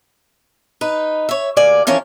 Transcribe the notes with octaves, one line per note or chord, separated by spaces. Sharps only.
D#4 B4
C#5 E5
D2 A#3 D5 G#5
E3 F3 C#4 A#4 C#5